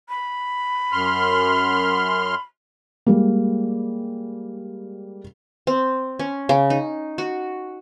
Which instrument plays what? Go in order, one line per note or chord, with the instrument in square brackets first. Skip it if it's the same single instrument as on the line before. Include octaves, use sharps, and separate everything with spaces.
[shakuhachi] B5
[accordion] F#2 C6 F6
[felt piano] G3 G#3 A#3
[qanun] C4
C#4
C#3
D#4
F#4